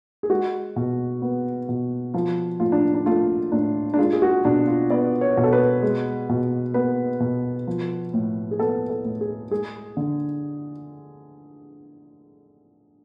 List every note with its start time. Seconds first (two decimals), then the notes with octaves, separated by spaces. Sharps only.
0.23 G#4
0.30 G#3 F#4
0.76 B2
1.22 B3
1.69 B2
2.14 F3 F4
2.60 A2 F4
2.72 D4
2.95 D4
3.06 A3 F4
3.52 A2 D4
3.94 D4
3.98 G#3 F4
4.13 G#4
4.22 F#4
4.45 B2 D4
4.68 F4
4.90 B3 D5
5.21 C#5
5.37 B2
5.43 A4
5.53 B4
5.82 G#3
6.29 B2
6.74 B3 B4
7.20 B2
7.67 F3
8.14 A2
8.51 G#4
8.59 B3 A4
8.90 A4
9.05 A2
9.21 G#4
9.51 G#3 G#4
9.97 D3